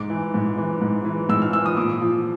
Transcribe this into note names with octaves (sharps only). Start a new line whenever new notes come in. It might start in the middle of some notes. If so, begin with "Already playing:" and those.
Already playing: G#2 D6
E3
G#2
E3
G#2
E3
G#2 E6
F6
E3 E6
D#6
A#2 D6
F3